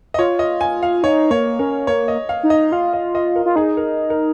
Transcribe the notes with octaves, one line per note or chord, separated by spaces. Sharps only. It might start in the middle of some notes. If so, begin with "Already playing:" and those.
D#5
F4 C#5
D#5
G#5
F5
D#4 C#5
A#3 C#5
C#4 A#4
A#3 C#5
D#5
F5
D#4
D#5
F4 F5
D#5
D#5
A#4
F4
D#4 G#4
A#4
A#4